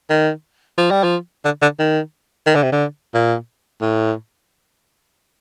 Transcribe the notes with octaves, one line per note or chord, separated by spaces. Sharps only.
D#3
F3
G3
F3
D3
D3
D#3
D#3
D3
C3
D3
A#2
A2